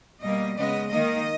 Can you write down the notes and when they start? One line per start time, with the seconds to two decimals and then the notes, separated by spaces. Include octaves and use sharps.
0.22 B2 G3 A#3 D#5
0.55 C#3 G#3 B3 D#5
0.90 D#3 A#3 D#5